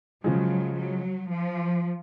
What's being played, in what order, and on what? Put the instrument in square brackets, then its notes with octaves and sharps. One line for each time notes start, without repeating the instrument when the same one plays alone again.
[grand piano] C#3 F3 G#3 [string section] F#3
[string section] F#3
F3